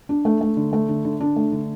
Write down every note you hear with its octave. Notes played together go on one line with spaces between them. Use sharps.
D4
A3
A3
D3
A3
D3
D3
D4
A3
D3